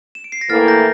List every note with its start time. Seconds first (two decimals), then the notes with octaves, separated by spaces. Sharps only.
0.15 E7
0.24 D7
0.32 C7
0.41 A#6
0.50 A2 E3 A#3 E4 A4 F6 A6
0.68 G6 A#6